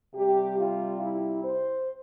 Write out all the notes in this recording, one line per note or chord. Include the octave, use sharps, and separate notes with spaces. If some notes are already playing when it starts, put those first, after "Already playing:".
C3 G3 G4
F4
E4
C5